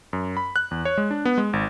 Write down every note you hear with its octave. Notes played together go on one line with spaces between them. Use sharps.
F#2
B5
F#6
E2
C#5
G#3
D4
B3
G#3
G#1